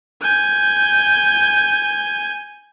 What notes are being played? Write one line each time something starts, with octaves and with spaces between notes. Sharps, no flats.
G#5 G6